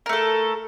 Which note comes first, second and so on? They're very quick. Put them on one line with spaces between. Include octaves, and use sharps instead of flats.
A#4 A3 A4